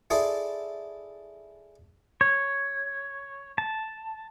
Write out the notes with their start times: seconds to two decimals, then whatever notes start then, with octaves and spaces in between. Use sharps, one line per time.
0.10 E4 G#4 A4 D5 C6
2.21 C#5
3.58 A5